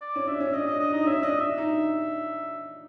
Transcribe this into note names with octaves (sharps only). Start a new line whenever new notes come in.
D5
C#4
D4 E5
C#4
D4 D#5
D4 D#5
D4 D#5
D#4 D#5
C#4 E5
D4 D#5
D4 E5
D#4